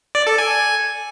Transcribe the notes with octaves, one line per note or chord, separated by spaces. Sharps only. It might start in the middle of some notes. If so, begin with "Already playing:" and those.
D5
A4
G#5